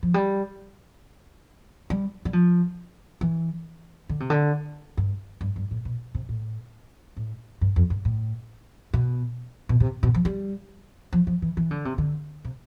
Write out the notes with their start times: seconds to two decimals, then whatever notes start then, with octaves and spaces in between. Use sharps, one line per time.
0.03 F3
0.14 G3
1.90 G3
2.25 G3
2.33 F3
3.21 E3
4.09 D3
4.20 C3
4.30 D3
4.97 G2
5.41 G2
5.56 G2
5.71 A2
5.85 B2
6.15 C3
6.29 A2
7.17 A2
7.61 G2
7.76 F2
7.90 G2
8.05 A2
8.93 B2
9.69 B2
9.80 C3
10.03 B2
10.15 F3
10.25 G3
11.13 F3
11.27 F3
11.42 E3
11.57 E3
11.71 D3
11.85 C3
11.98 D3
12.45 C3